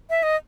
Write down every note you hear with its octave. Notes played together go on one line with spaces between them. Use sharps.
E5
D#5